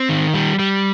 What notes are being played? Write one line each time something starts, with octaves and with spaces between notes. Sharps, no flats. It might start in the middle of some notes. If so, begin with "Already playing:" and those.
Already playing: C4
D#3
G3
G3